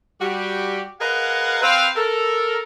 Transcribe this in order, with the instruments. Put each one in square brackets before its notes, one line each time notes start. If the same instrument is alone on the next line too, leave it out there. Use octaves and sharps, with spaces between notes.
[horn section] G3 F#4 G4
G#4 A#4 B4 D#5 F5 F#5
C4 B4 F5
A4 A#4